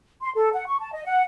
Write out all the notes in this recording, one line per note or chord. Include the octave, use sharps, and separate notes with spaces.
C6
A4
F#5
C#6
A5
D#5
F#5